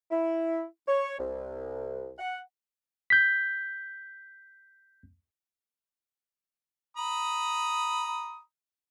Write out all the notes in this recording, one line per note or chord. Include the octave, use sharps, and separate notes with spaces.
E4
C#5
C2
F#5
G6 B6
A#5 B5 D#6